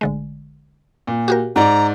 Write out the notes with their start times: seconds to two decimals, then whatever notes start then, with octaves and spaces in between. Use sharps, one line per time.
0.01 A1 D3 G#3
1.07 A#2
1.28 F#4 G4 A#4
1.56 G#2 D5 A#5